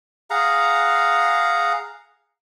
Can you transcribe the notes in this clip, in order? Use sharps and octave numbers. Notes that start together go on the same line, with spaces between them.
G#4 F5 F#5 A#5